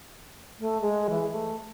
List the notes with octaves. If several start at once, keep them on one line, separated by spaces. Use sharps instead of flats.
A3
G#3
E3
A3